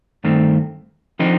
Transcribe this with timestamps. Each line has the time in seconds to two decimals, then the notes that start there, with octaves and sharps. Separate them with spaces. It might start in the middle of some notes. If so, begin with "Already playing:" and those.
0.24 G2 D#3 A3 C4
1.19 D3 F3 C4 D#4